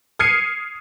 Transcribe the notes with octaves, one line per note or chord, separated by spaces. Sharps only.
D#6 F6 G#6 C7 C#7 D#7